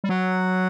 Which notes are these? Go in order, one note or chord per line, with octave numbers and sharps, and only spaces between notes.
G3
F#3 F#4 F#5